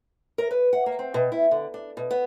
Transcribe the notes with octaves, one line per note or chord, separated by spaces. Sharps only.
A#4
B4
F#5
A#3
C4
B2
E4
D3
D4
B2
B3